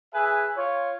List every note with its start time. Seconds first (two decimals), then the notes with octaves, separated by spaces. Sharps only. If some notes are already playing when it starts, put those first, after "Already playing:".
0.14 G#4 B4 E5 G#5
0.57 F4 C#5